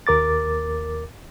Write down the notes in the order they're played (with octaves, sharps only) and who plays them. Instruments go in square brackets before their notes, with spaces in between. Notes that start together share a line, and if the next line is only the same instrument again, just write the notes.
[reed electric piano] D#2 A#4 D6 A6